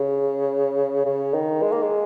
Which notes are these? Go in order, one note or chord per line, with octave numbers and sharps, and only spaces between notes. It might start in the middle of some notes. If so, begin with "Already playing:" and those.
Already playing: C#3
C#3
D#3
G#3
A#3
G#3